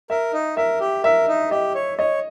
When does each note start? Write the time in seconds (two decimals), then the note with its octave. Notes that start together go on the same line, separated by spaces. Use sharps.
0.10 A#4 E5
0.33 D#4
0.57 A#4 E5
0.80 G4
1.04 A#4 E5
1.28 D#4
1.51 G4 D#5
1.75 C#5
1.98 C#5 D#5